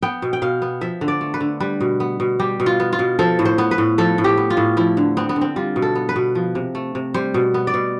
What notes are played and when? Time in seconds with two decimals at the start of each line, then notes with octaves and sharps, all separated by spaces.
0.03 B3 G5
0.22 B2
0.33 G5
0.42 B2 F5
0.62 B3
0.81 F3 E5
1.01 D3
1.08 D5
1.21 A3
1.34 B4
1.41 D3
1.60 G3 B4
1.81 B2
2.00 B3
2.20 B2
2.39 G3 G4
2.60 B2
2.66 F4
2.80 B3
2.93 F4
2.99 B2
3.19 F3 A4
3.39 A2
3.45 C5
3.58 B3
3.71 B4
3.78 A2
3.98 F3 A4
4.18 A2
4.24 G4
4.38 B3
4.50 F4
4.57 A2
4.77 F3 E4
4.97 D3
5.17 B3 C4
5.29 B3
5.36 D3
5.41 C4
5.56 G3 F4
5.76 B2
5.82 A4
5.95 B3
6.09 B4
6.16 B2
6.35 F3
6.55 C3
6.75 A3
6.95 C3
7.14 G3 C5
7.34 B2
7.54 B3
7.67 D5
7.74 B2